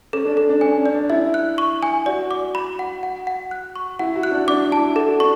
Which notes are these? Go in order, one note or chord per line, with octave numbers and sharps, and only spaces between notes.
C#4 A4
D4
A4
D4
C#4 G#5
C#4
D5
D4
E4 E5
F#6
C#6
G#5
F#4 D5
D6
B5
F#5
F#5
F#5
F#6
C#6
E4 F#5
F#4
F#6
D4
D4 D6
E4 A5
F#4 A4
D4 C#6